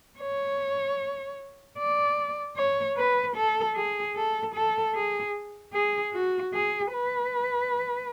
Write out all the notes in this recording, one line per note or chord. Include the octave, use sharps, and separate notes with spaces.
C#5
D5
C#5
B4
A4
G#4
A4
A4
G#4
G#4
F#4
G#4
B4